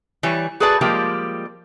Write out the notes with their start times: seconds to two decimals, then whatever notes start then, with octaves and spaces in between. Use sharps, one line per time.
0.23 E3 G3 C#5
0.60 F#4 G#4 A4 B4 D5 A5
0.81 F3 G3 G#3 A#3 G4